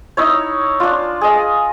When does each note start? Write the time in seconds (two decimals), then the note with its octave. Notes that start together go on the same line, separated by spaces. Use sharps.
0.17 D#4 E4 C#5
0.80 D4 F4
1.21 G#4 D#5